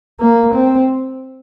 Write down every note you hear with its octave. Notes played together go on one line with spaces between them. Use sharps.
A#3
C4